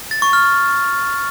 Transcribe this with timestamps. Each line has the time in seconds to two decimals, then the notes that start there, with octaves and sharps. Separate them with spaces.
0.11 A6
0.22 C#6
0.33 F6